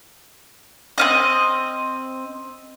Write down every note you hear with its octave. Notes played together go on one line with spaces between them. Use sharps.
C4 C#4 D#5